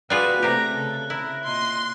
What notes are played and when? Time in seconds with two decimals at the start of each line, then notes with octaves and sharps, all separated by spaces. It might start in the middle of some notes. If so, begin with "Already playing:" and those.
0.10 G3 F4 F#4 G#4 B4 F#6
0.42 C3 A3 G4 A#5
0.73 C#3 A4
1.10 E4 A#4
1.44 A#2 D#5 C6